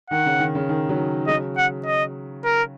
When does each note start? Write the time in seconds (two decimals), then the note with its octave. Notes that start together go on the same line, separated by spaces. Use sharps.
0.10 D#3 F#5
0.26 C#3
0.40 D#3
0.55 C#3
0.69 D#3
0.89 C#3 F#3
1.27 C#3 F#3 D#5
1.58 F#5
1.86 D#5
2.45 A#4